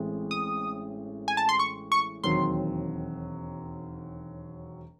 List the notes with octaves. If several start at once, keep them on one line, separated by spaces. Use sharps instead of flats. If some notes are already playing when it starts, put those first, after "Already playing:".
Already playing: A1 A2 G#3 C4
D#6
G#5
A5
C6
C#6
C#6
E1 D#2 D#3 F#3 C4 C6